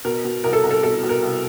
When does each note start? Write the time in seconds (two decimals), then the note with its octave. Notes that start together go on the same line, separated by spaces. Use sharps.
0.05 B2 A#4
0.25 B2
0.44 C2 A#4
0.53 A4
0.64 C2
0.71 A4
0.83 B2 A4
1.03 B2
1.09 A#4
1.23 C2